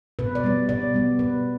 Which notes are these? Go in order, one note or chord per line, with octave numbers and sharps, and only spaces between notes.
B2 B4
D5
G3 B3
B2 D5
G3 B3
B2 B4